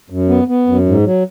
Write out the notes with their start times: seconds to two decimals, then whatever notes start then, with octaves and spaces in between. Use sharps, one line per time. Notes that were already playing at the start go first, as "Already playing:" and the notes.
0.10 F#2
0.29 B3
0.48 B3
0.67 F#2
0.86 G#2
1.05 F#3